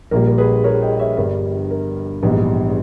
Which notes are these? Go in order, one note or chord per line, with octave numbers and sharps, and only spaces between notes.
A#1 A#2 G3 A#4
A#4
G#4 B4
A#4 C#5
D#5 G5
C#5 E5
G1 G2 G3 A#4
A#4
A#1 G#2 E3 G3 B3